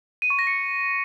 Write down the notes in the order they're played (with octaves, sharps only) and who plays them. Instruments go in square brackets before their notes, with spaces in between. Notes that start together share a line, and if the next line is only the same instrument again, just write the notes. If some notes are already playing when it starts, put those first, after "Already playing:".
[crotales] D#7
C#6
A#6
C#7